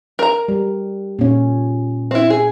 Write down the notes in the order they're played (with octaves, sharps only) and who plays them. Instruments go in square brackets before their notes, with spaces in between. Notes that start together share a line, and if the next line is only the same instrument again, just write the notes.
[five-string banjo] A#4 A#5
[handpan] G3
A#2 C#4
[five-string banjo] C4 E4
G#4